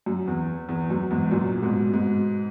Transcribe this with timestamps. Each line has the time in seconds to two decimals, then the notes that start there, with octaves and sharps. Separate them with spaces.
0.06 F#2
0.28 E2
0.69 E2
0.90 F#2
1.11 E2 G#2
1.31 F#2 A#2
1.62 G#2 B2
1.94 G#2 B2